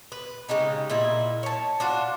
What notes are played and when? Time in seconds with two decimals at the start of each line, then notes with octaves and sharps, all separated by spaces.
0.12 B4
0.49 C#3 G#3 D#4 G4
0.90 A#2 D#4 E4
1.43 C#5 A5
1.80 D4 F4 F#4